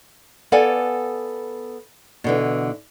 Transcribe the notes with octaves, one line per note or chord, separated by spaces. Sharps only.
B3 A4 D5 F5 F#5 G#5
B2 D3 E3